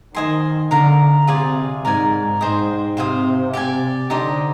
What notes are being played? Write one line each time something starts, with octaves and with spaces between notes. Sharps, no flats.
D#3 C5 D#5 G#5 C6
D3 A#4 F5 A#5
C3 F4 G#4 D5 G#5
G#2 A#4 D5 G#5
G#2 G#4 C5 D#5 G5
C3 C5 F5 G#5 D#6
G4 D5 G#5
D3 D#4 G4 C5 D#5